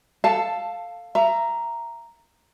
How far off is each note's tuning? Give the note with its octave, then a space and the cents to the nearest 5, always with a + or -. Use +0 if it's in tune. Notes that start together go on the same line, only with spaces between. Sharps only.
A4 +15 F5 +0 A5 +0
E5 +35 A#5 +0